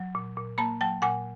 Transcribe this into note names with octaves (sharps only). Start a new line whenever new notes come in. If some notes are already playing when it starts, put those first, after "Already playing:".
Already playing: F#3
A#2
A#2
A#3 A5 B5
F#3 G5 A5
A#2 F#5 G#5